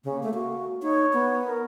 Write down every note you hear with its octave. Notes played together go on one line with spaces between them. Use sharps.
C#3 A#3
A3
F#4
D#4 C#5
B3
A#4